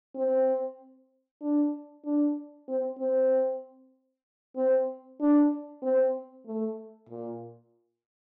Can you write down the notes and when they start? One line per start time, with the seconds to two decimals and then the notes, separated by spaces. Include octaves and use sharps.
0.16 C4
1.42 D4
2.05 D4
2.68 C4
2.99 C4
4.56 C4
5.20 D4
5.83 C4
6.46 A3
7.09 A#2